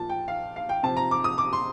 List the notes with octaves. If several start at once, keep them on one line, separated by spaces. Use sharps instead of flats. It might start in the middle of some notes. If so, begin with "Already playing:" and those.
Already playing: A#2 F3 A5
G5
F5
F5
G5
C3 F3 A5
A#5
D6
D#6
D6
C6